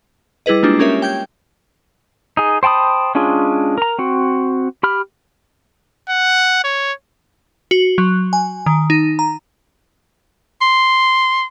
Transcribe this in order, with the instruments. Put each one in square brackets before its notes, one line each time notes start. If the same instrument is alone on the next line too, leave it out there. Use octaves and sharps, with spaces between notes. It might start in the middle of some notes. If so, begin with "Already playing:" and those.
[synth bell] G3 E4 G#4 B4 D#5
G#3 A#3 D4 F4 G4
C#4 G4 A#4 C#5 E5
G5 G6 G#6
[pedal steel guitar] D#4 G#4
C5 G5 A5 B5 D#6
G#3 C#4 D4 F4 G#4
A#4 A#5
C4 F#4
G4 B5 F6
[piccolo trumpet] F#5
C#5
[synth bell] F#4
F#3
G#5
D#3
D#4
A#5
[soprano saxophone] C6